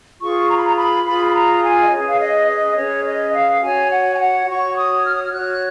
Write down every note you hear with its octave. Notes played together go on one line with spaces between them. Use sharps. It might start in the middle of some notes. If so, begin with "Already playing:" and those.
F4 G#4 B4 C#6
A#5
B5
A#5
B5
F4 G#4 B4 B5
B5
A#5
G#5
D#5
C#4 G#4 B4 C#5
F5
D#5
D#5
C#4 G#4 B4 C#5
D#5
F5
F#5
F#4 C#5 G#5
F#5
G#5
F#5
F#4 C#5 C#6
D#6
F6
D#6
F6
F#4 C#5 F#6